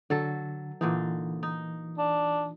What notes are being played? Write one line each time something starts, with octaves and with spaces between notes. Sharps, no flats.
D3 F#3 A4
A#2 D3 E3 D#4
D#4
D4